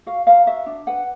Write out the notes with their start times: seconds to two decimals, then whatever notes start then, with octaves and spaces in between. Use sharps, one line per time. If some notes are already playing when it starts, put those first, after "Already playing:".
0.06 F#4 F5
0.27 A#4 F5
0.46 F#4 E5
0.66 D4
0.87 B4 F#5